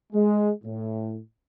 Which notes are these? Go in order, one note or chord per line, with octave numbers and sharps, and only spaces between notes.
G#3
A2